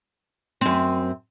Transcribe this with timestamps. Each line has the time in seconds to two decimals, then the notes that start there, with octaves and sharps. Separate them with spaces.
0.61 F#2 C4